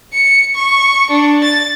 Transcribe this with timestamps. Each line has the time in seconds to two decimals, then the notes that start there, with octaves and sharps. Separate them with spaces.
0.13 C#7
0.55 C#6
1.10 D4
1.44 A6